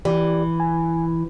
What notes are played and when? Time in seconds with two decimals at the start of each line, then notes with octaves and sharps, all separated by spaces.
0.05 E3 G4 D5
0.60 G#5